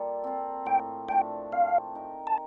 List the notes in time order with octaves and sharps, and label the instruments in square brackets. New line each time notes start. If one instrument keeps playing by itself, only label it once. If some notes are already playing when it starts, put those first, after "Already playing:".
Already playing: [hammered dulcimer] G3 A#3 F4 A4
C4 F4
[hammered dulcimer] A2 [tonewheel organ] G5
[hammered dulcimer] F3 A3 D4 [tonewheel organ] G5
[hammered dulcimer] C4 [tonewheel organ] F5
[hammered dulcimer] D#4 A#4
[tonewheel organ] A5